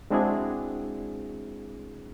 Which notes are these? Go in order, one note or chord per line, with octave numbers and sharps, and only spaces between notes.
G#3 C4 D4 E4 F#4 G#4